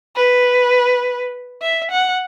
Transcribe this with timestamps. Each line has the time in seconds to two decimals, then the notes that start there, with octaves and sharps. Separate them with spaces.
0.16 B4
1.62 E5
1.91 F#5